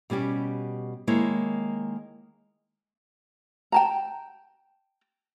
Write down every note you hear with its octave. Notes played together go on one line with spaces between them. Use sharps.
B2 G3 C#4 G4
D#3 G#3 A#3 E4 C#5
G5 A5 A#5